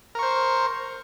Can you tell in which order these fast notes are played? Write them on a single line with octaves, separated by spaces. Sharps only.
A#4 C#6 C5